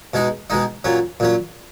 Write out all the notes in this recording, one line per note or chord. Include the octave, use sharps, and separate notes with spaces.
B2 G#3 D#4
B2 G#3 D#4
A#2 F#3 C#4
A#2 F#3 C#4